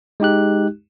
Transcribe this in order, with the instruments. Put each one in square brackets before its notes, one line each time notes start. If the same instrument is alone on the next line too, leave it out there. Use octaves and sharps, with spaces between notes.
[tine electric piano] G#3 D#4 G4 F#6